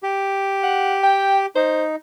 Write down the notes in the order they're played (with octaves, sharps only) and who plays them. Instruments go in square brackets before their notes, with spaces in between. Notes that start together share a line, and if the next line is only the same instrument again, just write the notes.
[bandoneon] G4
[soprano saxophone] F#5
G5
[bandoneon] D#4 [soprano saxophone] C5